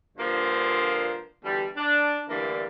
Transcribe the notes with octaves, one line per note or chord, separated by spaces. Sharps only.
G2 A#2 D3 F3 A#3 C5
B2 D3 E3 G3
D4
A2 D3 E3 G3 A#3 D5